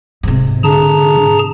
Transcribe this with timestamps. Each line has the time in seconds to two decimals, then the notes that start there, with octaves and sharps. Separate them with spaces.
0.23 G#2 C3
0.64 D3 G#4 A5 A#5